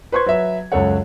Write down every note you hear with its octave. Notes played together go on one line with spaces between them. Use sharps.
B4 C5 C6 C#6 G#6
F#3 B4 E5
C#2 F#2 A4 C#5 F#5